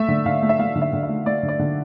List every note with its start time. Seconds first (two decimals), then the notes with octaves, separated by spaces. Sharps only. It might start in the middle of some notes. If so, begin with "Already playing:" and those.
Already playing: A3 E5
0.08 D3
0.26 D3 F5
0.42 A3
0.49 E5
0.59 A3 F5
0.75 D3
0.82 E5
0.93 D3
1.03 E5
1.09 A3
1.25 A3 D5
1.43 D3
1.49 D5
1.59 D3